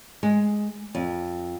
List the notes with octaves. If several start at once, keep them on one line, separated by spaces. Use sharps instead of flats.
G#3
F2